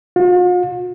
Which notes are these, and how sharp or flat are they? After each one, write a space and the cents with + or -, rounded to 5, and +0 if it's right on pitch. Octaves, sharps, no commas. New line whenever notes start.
F4 +45